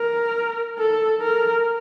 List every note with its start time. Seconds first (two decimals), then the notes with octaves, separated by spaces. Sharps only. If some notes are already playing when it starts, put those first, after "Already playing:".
Already playing: A#4
0.78 A4
1.21 A#4